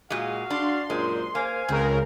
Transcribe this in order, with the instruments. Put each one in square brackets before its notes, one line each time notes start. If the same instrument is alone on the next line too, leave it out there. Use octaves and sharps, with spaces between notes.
[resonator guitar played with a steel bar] A#2 G#3 [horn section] F#4 F5
[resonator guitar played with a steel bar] D4 [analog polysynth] C6
[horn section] F#2 A#2 C5 [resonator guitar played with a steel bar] G#3
[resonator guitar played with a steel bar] A#3 [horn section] C5 F5 G#5
[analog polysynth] C#2 C#3 A#4 [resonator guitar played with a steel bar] C4